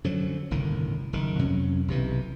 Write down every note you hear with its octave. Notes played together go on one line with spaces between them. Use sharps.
F#2 D3 F3 F#3
G1 C2 A2 D#3
F#1 D#3
F2 C3 F#3 C#4
B1 C3 E3